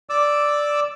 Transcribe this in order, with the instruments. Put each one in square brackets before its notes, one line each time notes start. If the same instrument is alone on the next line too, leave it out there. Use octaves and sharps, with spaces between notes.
[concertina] D5 D6 E6